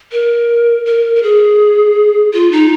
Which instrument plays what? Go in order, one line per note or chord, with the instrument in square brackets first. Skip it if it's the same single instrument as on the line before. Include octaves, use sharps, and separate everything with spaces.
[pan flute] A#4
A#4
A#4
G#4
F4
D#4